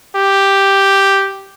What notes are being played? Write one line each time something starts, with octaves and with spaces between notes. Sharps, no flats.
G4